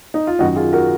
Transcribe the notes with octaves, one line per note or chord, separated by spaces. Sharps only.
D#4
F4
F#2 D#3 F#3 D#4 F#4
F4 G#4
F#4 A#4